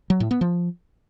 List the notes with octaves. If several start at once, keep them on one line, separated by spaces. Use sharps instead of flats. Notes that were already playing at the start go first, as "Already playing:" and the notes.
F#3
A2
B3
F3